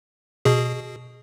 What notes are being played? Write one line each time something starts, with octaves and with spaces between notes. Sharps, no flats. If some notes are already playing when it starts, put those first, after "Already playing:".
B2 G#4